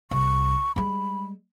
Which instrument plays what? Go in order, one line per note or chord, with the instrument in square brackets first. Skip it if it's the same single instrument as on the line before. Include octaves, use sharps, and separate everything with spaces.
[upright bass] C2 [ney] C#6
[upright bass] G3 G#3 [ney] B5